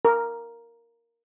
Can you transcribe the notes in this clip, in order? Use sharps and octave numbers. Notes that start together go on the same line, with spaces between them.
A#4